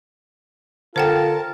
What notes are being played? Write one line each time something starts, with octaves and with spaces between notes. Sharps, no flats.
D3 F4 A4 A#4 C5 F#5 G5 A5